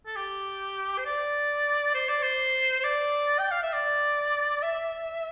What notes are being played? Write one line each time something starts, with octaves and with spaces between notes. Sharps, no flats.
A4
G4
C5
D5
C5
D5
C5
C5
D5
G5
F5
E5
D5
E5